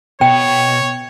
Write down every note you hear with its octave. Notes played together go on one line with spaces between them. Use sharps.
B2 C#5 G5